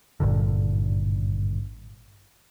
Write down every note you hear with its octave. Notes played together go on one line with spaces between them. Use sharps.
G#1 G2 A#2 D3